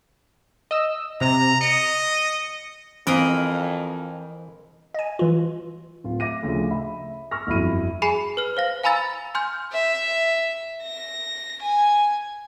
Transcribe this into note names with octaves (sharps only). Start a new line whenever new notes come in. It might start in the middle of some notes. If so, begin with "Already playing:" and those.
D#5 E6
C3 A#5
D#5 C#7
F2 E3 C4 A#4 D#5 F5 B5
D#5 G#5
E3 F4
D1 F4
E5 D6 A#6 D#7
D2 C#3 F3
E5 B5
C#6 E6 F6 A#6
G1 F2 F#3 E4 B5 D#7
G#4 G#5 B5 C7 E7
B4 F6
C5 F5 A#6
F5 G#5 A#5 B5 E6 A6
G#5 C6 F6 G6
E5
A#6
G#5